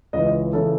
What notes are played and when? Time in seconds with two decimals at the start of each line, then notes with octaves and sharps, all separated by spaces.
0.13 C#2 C#3 E3 D#5
0.53 C#3 E3 A4